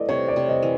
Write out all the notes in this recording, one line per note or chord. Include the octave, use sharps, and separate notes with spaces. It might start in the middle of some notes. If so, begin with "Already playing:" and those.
Already playing: E3 A3 D5 D#5
C3 C#5
D5
C3
D#5
E3